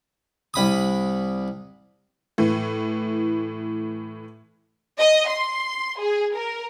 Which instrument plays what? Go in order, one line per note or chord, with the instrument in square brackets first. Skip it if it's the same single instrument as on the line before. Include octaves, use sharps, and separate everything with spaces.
[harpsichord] C2 B5 D#6
[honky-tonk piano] A2 E3
[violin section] D#5
C6
G#4
A#4